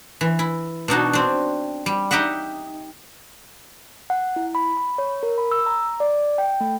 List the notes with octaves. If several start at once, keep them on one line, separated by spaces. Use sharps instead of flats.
E3
E4
B2 D4 D#4 F#4
C4 D4
G3
D#4 G4 D#5 E5 F#5
F#5
E4
B5
B5
C#5
A#4
B5
E6
A#5
D5
G5
A3